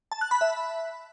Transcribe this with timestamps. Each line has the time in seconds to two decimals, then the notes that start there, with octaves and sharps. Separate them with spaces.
0.12 A5
0.21 F#6
0.31 B5
0.41 E5